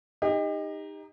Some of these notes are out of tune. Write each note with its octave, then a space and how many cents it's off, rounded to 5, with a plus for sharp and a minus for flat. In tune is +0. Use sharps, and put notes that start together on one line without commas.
D#4 +0 G4 +35